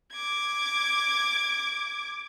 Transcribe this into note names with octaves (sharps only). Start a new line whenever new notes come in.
D6 G#6